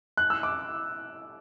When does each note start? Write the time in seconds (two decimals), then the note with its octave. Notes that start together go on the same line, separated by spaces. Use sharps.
0.17 F#6
0.30 E6
0.43 D6